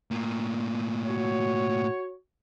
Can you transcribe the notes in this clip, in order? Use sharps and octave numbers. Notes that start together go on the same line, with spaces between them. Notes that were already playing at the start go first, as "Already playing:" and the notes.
A2 A#3
F#4 C#5